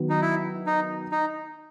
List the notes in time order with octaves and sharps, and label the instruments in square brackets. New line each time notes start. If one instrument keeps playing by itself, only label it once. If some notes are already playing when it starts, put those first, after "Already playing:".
Already playing: [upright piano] D#3 F#3 B3
[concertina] D#4
E4
D#4
D#4